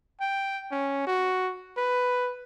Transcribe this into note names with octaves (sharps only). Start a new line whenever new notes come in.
G5
C#4
F#4
B4